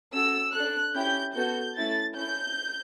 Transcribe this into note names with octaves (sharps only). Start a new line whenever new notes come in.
C#4 F#4 A4 E6
D4 A4 F#6
C#4 E4 G4 G6
B3 F#4 A4 G6
A3 C#4 E4 A4 A6
C#4 E4 A4 G6